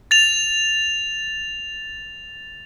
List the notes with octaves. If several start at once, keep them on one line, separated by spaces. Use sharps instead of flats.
A6 F7